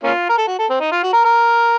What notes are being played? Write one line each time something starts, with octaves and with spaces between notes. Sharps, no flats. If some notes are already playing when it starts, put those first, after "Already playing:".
A#3 C#4 F4
A#4
A4
F#4
A4
C4
D#4
F4
F#4
A#4
A#4